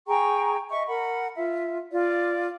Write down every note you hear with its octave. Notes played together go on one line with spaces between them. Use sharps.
G#4 G5 A#5 C#6
D#5 E5 C#6
A#4 F#5 B5
F4 E5
F4 D5